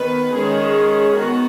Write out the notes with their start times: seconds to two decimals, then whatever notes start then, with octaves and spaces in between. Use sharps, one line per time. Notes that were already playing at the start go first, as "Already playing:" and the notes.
Already playing: D#3 B3 B4
0.35 D#3 G#3 C#4 G#4
1.17 D#3 B3 F#4